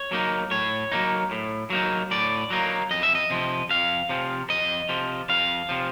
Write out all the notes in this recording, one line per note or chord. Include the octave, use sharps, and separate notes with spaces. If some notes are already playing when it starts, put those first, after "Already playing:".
Already playing: C#5
F#3 A#3 D#4
A2 C#5
F#3 A#3 D#4
A2
F#3 A#3 D#4
A2 D5
F#3 A#3 D#4
F2 D#5
E5
D#5
C3 F3
F2 F5
C3 F3
F2 D#5
C3 F3
F2 F5
C3 F3